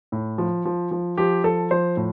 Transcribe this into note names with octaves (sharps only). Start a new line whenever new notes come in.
A2
F3
F3
F3
F3 G4
F3 A4
F3 C5
A2